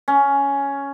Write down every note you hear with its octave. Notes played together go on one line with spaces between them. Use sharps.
C#4